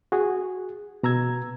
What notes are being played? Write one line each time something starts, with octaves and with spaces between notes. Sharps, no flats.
F#4 G#4
B2 A#5 E6 G#6